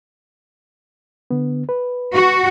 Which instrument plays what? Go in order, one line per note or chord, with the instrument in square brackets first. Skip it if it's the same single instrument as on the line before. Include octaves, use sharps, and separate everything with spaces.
[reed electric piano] D3 B3
B4
[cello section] F#4